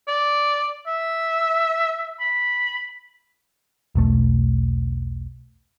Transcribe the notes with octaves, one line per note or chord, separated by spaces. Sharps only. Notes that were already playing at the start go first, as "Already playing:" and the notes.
D5
E5
B5
E1 B1 A3